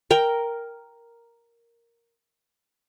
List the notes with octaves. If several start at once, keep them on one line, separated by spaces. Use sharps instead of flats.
A#4 G5